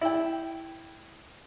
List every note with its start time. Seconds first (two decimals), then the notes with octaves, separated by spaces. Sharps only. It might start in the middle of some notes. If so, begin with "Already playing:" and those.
0.01 E4 G5